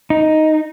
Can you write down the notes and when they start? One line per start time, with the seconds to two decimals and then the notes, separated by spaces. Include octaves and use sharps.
0.10 D#4